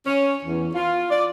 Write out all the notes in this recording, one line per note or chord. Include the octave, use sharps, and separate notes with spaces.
C#4
E2
F4
D5